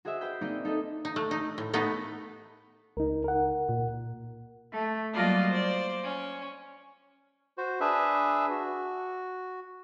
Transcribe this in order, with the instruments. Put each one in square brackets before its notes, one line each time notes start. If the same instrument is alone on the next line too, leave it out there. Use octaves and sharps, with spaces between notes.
[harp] F#4 G#4 C5 D#5 E5
B4 C5 G5 G6 B6
A#3 C4 D#4 D5 D#5
D#4 A4 B4 D#5
[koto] D#4
A3
D#4
A2
A3 B3 D#4 B4
[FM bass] C#2 [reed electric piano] D#4 A#4
[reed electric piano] A#4 F#5
[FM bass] A#2
[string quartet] A3
F#3 G3 A#3 F4 D5 D#5
C5 D5
C#4
[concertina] F#4 C5
D4 G#4 B4 E5
F#4